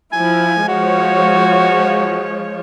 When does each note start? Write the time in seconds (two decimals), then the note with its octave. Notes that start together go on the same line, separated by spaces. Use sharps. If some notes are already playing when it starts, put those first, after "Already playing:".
0.12 F3 E4 G#5
0.68 F3 G#3 F#4 C#5